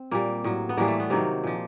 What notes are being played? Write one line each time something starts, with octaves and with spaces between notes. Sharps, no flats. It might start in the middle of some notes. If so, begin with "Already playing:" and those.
Already playing: C4
A#2 G3 A#3
A2 F#3
B3
A2 E3 G3 A#3
A3
B3
C3 D#3 F#3 A#3
A#2 F3